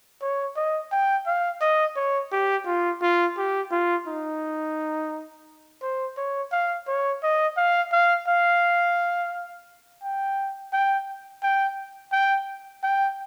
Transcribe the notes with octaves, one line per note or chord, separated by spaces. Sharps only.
C#5
D#5
G5
F5
D#5
C#5
G4
F4
F4
G4
F4
D#4
C5
C#5
F5
C#5
D#5
F5
F5
F5
G5
G5
G5
G5
G5